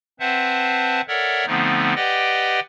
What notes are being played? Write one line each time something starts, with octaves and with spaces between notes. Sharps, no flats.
C4 B4 C5 E5 F#5 A5
A4 A#4 C#5 D5 E5 F#5
D3 F3 A3 B3 C4 D#4
G4 B4 D5 D#5 F#5 G5